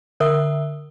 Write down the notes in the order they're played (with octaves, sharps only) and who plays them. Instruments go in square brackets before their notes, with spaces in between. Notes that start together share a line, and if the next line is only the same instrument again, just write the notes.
[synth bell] D3 A#4 E5 D#6 E6 G7